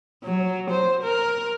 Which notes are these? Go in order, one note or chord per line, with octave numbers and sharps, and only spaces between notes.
F#3
C5
A#4